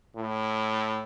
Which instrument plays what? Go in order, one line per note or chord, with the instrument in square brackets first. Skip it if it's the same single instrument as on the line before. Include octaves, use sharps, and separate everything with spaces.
[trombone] A2